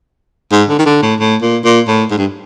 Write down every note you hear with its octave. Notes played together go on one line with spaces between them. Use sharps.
G#2
D3
D#3
D3
A2
A2
A#2
A#2
A2
G#2
G2